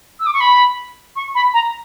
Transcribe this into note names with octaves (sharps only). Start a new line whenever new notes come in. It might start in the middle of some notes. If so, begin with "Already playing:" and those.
E6
D6
C#6
B5
C#6
B5
A#5